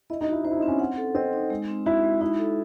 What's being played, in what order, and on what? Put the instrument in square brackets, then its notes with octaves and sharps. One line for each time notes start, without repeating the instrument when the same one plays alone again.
[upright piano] E4 [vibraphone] D#5
[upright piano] D#4
[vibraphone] F#4
[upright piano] E4
[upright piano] D#4 [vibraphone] C5
[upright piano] E4
D#4
[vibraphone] C4
[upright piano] C#4
[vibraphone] F#5
A4
[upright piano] C4 [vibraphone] D#5
[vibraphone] D#4
G#3
C4
[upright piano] E4 [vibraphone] F#4
[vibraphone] G#3
[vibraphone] D#4 [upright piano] E4
[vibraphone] A4